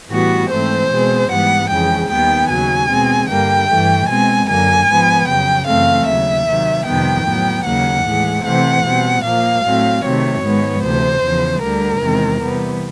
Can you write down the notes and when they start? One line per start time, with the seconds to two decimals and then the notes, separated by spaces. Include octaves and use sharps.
0.11 A2 E3 G3 B3 F#4
0.50 G#2 E3 A3 C4 C5
0.90 B2 G#3 C4
1.30 G#2 E3 G3 B3 F#5
1.69 F2 C#3 E3 G#3 G5
2.09 D#2 D#3 G3 B3 G5
2.49 D#2 C#3 F#3 G#5
2.89 B2 G#3 C4
3.28 G2 D3 G3 A#3 G5
3.68 G2 E3 A3
4.08 B2 G#3 C4 G#5
4.47 F#2 D3 F#3 A#3 G#5
4.87 G#2 F3 G#3 B3
5.27 F2 C#3 F#3 G5
5.66 F#2 C#3 E3 A3 C4 F5
6.06 D#2 C#3 F#3 E5
6.46 C3 D#3 F#3
6.85 F2 C3 D#3 G3 B3 G5
7.25 A2 F#3 B3
7.65 D#2 C#3 F#3 A#3 F#5
8.05 A2 E3 G#3
8.44 C3 E3 A3 C4 F#5
8.84 B2 G3 C4
9.24 A#2 F3 A#3 F5
9.64 A2 F#3 A3 C4
10.03 C3 D#3 F#3 A3 C4 C#5
10.43 G#2 D#3 G#3 B3
10.83 D2 C3 E3 C5
11.22 E2 C#3 F3
11.62 D2 D3 G3 A#4
12.01 E2 C3 D#3 G#3 C4
12.41 C3 E3 G3 B3